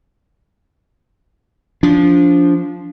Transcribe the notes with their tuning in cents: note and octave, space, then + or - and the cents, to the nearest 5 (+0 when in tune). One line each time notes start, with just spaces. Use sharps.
F3 +0 D4 -25